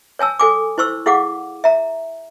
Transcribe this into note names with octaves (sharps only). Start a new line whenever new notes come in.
C#5 G#5 A5 E6
A4 G#5 D6
E4 C5 C#6 E6
E4 G#4 F5 F#5 D6
E5 A#5